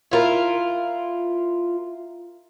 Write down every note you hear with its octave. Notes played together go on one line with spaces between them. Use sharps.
E4 F4 A#4